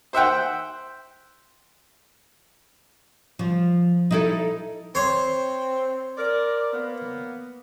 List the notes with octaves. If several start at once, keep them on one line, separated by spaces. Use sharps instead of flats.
C5 E5 F#5 G5
F3
D#4 E4 A4
C4 C5 C#5
A#4 D5
A#3 B3